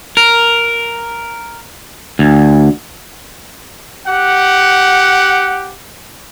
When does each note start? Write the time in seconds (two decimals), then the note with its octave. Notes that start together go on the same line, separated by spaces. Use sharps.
0.17 A#4
2.19 D2
4.07 G4 F#5